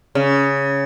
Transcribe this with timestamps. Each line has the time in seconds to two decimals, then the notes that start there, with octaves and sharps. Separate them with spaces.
0.15 C#3